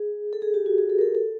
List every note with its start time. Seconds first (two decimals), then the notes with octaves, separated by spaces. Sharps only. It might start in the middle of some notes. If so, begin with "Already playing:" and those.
Already playing: G#4
0.33 A4
0.42 G#4
0.54 G4
0.66 F#4
0.78 G#4
0.90 A4
0.98 A#4
1.01 A4
1.15 A4